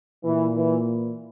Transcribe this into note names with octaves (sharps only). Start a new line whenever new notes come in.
A#2 E3
E3